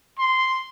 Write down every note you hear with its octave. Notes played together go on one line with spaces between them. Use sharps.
C6